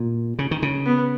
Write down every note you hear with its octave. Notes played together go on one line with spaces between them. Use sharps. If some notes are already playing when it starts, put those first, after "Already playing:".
Already playing: A#2
C#3
D#3
C#3
B3